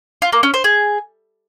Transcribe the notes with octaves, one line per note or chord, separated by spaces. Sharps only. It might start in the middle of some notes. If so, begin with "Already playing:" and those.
F4
A#3
C#4
C5
G#4